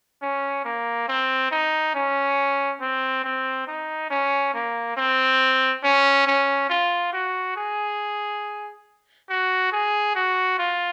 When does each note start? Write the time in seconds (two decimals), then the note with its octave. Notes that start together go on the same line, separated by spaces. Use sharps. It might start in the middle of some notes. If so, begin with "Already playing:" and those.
0.22 C#4
0.65 A#3
1.08 C4
1.51 D#4
1.95 C#4
2.81 C4
3.24 C4
3.67 D#4
4.10 C#4
4.54 A#3
4.97 C4
5.83 C#4
6.27 C#4
6.70 F4
7.13 F#4
7.56 G#4
9.29 F#4
9.72 G#4
10.15 F#4
10.59 F4